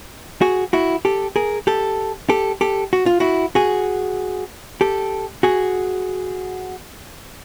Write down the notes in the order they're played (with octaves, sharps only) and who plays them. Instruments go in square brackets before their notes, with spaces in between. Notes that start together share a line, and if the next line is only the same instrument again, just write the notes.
[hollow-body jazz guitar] F#4 G#4
E4 F#4
G4 A4
G#4 A#4
G4 A4
G4 A4
G4 A4
F#4
F4
E4 F#4
F#4 G#4
G4 A4
F#4 G#4